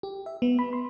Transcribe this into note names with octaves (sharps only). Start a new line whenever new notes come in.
G4
E5
B3
B5
C6